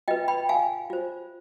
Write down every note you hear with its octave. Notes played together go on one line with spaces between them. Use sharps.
F4 B4 D#5 G5
G5 B5
F5 G#5
F4 C5